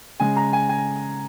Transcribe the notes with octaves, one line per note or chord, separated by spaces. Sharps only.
C#3 G#3 G#5
A#5
G#5
G#5